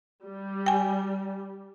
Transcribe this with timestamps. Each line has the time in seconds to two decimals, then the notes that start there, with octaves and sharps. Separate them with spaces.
0.24 G3
0.66 G5 G#5